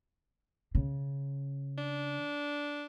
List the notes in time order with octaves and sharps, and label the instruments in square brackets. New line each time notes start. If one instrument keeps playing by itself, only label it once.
[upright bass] C#3
[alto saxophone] D4